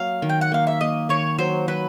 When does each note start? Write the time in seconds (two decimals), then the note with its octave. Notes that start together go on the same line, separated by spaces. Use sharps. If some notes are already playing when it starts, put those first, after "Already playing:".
Already playing: F#3 A#3 F5
0.22 D#3
0.29 G5
0.41 F#5
0.52 A#3 F5
0.67 E5
0.81 A#3 D#5
1.09 D#3 C#5
1.38 F#3 C5
1.68 F#3 B4